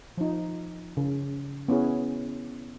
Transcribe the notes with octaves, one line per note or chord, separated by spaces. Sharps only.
F3 D#4
C#3
B3 C#4 E4 G#4